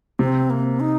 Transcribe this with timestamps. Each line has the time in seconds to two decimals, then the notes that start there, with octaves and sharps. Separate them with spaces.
0.19 C3 C4
0.50 A#3
0.80 D#4